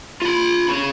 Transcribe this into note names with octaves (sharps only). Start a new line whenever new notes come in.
F4 B5
C#4 G#4